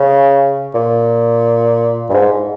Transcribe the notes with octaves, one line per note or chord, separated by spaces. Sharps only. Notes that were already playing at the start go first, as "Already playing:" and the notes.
Already playing: C#3
A#2
G2
G#2